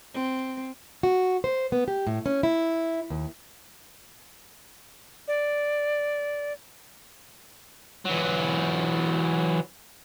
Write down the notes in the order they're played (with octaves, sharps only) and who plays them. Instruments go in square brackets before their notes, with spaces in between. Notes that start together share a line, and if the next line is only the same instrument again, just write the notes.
[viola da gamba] C4
[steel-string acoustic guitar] F#4
C5
B3
G4
A2
C#4
E4
D#2
[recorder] D5
[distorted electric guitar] E3 F#3